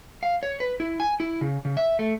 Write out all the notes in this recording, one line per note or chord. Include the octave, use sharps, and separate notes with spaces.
F5
C#5
B4
E4
G#5
E4
C#3
C#3
E5
A3